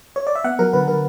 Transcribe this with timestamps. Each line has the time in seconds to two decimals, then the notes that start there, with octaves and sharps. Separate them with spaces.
0.16 C#5
0.27 D5
0.35 E5
0.44 B3 F#5
0.59 F#3 A#4
0.73 D3 B4
0.87 D3 A#4